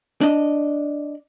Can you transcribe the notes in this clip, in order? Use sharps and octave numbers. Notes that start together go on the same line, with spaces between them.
D4 D#5